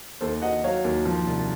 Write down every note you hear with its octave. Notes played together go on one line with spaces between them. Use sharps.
D#2 A4 C5
D#2 D#5 F#5
F#3 C#5 F5
D#2
F3
C2